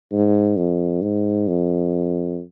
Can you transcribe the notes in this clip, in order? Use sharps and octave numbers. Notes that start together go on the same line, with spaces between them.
G#2
F2
G#2
F2